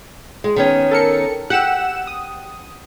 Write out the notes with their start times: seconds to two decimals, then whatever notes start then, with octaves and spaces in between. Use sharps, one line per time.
0.44 G#3
0.56 D#3 B3 C#4
0.91 A4 A#4 C#7
1.50 G4 F#5 E6 E7
2.07 D#6